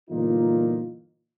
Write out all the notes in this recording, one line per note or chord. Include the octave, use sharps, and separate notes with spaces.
G1 A#2 E3 A#3 D#4 F4